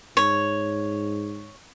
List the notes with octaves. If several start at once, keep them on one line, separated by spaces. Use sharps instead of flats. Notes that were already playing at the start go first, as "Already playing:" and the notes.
G#2 C#5